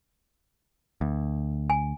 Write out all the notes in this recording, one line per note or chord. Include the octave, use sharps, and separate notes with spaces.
D2
G#5